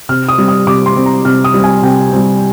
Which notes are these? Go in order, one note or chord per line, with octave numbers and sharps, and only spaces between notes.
C3 F6
D#6
G3 C4
D#6
C3 D6
C6
G3 C4
A#5
C3 F6
D#6
G3 C4
G#5
C3 G5
G3 C4